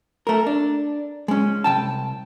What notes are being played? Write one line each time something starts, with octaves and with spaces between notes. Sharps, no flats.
A3 A#4
D4
G#3 C#4
C2 D#3 G5 A5